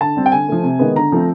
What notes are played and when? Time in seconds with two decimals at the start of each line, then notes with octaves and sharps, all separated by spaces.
0.01 D3 A5
0.16 G3 C4
0.26 G5
0.32 D3 G#5
0.49 F3 A3
0.63 C3
0.79 D#3 G#3 B3
0.95 D3 A#5
1.12 F3 A3 C4